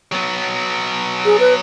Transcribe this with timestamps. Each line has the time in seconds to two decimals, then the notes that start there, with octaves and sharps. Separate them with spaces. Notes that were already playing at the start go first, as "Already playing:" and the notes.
0.12 F#3 B3
1.25 G#4
1.40 B4